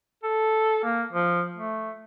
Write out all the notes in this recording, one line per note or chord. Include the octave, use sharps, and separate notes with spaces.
A4
A#3
F3
A3